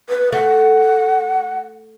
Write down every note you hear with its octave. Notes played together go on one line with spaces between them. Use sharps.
B4
A3 F#5